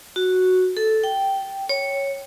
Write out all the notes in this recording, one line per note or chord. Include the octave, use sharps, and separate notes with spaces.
F#4
A4
G5
C#5